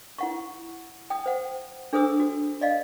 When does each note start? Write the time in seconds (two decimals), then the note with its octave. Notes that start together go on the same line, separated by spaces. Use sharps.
0.18 E4 F#5 C#6
1.10 G5 D#6
1.26 C5 F#5
1.93 D4 G#4 A4 C5 D#6 E6
2.20 F#4
2.61 D5 D#5 F5